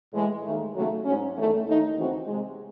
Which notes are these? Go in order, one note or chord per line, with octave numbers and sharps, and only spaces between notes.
A2 E3 G#3
D#2 D#3 A3
D#2 C#3 F#3 A3
G#2 F#3 C#4
E2 D#3 A3
D#2 D#3 A3 D#4
D#2 C#3 E3 C4 F#4
C3 D#3 G#3